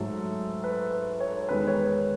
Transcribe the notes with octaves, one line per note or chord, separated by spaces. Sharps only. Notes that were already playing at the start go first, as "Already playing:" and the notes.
Already playing: G#2 F#3 A3 A4
B4
B4
C#5
E2 D#3 G#3 B4
C#5
B4